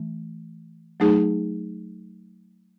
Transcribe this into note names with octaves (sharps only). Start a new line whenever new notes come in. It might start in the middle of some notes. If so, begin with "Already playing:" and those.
Already playing: E3 A3
F#3 A3 D#4 G#4